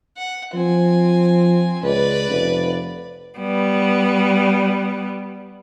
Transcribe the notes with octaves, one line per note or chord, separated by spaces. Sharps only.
F#5
F3 C4 G#5
C#2 B4 D5
F1
G3 B3